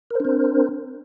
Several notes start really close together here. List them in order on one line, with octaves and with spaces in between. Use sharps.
A#4 C5 D4 C4